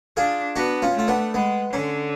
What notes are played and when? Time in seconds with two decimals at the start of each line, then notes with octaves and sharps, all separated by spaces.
0.17 D4 F4 G#4
0.56 B3 D4 F#4
0.82 C#4 F4
0.95 A3 F4
1.08 B3 D4
1.34 G#3 B3
1.73 D3 C#4